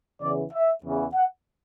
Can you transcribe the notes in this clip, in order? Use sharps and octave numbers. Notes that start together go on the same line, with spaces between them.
E2 C#3 E3 D5
E5
E2 C#3 E3
F#5